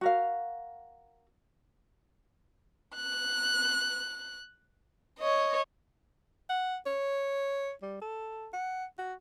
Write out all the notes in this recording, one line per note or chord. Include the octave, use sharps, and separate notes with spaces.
F#4 A#4 F5
F#6
C#5 D#5
F#5
C#5
G3
A4
F#5
F#4